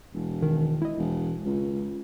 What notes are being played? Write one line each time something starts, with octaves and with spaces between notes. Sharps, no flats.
E1
D#3
E4 D#5
E1
C#2